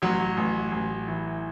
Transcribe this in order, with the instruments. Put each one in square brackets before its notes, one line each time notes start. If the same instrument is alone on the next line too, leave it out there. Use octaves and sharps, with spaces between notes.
[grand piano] A1 F#3
A1
A1
E3